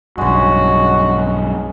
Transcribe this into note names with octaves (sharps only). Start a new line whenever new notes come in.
B1 G2 C#3 G#3 F#4